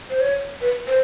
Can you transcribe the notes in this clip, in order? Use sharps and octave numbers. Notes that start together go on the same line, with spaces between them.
C5
C#5
B4
C5